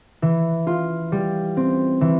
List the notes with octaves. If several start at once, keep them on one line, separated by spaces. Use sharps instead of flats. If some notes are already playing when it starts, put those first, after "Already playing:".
E3
F4
G3
C4
E3